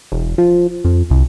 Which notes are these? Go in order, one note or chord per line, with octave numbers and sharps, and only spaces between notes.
E1
F3
F2
C2